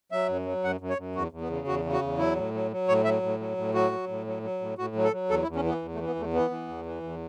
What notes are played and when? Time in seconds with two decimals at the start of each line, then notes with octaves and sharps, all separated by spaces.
0.12 F#3 E5
0.28 F#2
0.46 F#3
0.63 F#2 F#5
0.81 F#2
0.90 C#5
0.98 F#2
1.15 E2 F#4
1.32 E2
1.41 B3
1.50 C#3
1.67 E2 F#4
1.85 C#3
1.93 F#4
2.02 E2
2.18 F#3 E4
2.36 A2
2.54 F#3
2.71 F#3
2.88 A2 C#5
3.05 F#3 E5
3.22 A2
3.40 F#3
3.57 A2
3.74 F#3 F#4
3.92 F#3
4.08 A2
4.27 F#3
4.43 F#3
4.61 A2
4.78 A2 F#4
4.96 F#3
5.04 A4
5.12 F#3
5.29 E2 A4
5.43 E4
5.47 E2
5.56 C#4
5.64 E3 B3
5.82 E2
5.95 A3
5.99 E3
6.07 B3
6.15 E2 A3
6.33 E3 B3
6.51 E3
6.68 E2
6.86 E3
7.03 E2